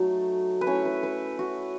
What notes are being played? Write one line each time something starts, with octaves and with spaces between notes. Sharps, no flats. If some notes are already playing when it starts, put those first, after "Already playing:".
Already playing: F#3 A3 D#4
B4
A3 C#4 E4 C#5
B4
B4
F#4